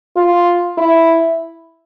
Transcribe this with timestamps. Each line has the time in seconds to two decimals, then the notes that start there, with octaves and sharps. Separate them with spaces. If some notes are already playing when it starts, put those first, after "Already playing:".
0.16 F4
0.78 E4